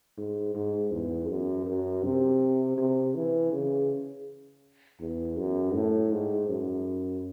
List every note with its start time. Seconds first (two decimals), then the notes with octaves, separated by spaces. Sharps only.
0.18 G#2
0.55 G#2
0.92 E2
1.29 F#2
1.66 F#2
2.04 C3
2.78 C3
3.15 E3
3.52 C#3
5.01 E2
5.37 F#2
5.75 A2
6.12 G#2
6.49 F#2